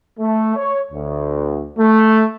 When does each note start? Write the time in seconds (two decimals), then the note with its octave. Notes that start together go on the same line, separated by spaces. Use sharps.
0.20 A3
0.56 C#5
0.92 D2
1.78 A3